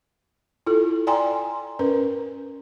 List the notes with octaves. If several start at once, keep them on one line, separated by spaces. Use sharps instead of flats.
E4 F4 A4
D5 G5 G#5 A#5 C6
C#4 A#4 B4